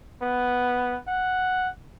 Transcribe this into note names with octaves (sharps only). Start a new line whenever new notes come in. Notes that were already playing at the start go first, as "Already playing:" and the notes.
B3
F#5